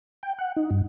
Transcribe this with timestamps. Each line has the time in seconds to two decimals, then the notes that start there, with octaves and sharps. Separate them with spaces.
0.23 G5
0.38 F#5
0.56 D#4
0.71 G2